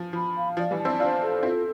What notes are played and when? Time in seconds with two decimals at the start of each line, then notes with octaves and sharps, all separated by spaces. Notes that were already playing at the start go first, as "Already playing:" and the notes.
Already playing: F3
0.13 F3 B5
0.35 F5
0.57 F3 D5
0.71 E3 G3
0.79 A5
0.85 C4 E4
1.00 D4 F4 C5
1.21 A4
1.43 C4 E4 F4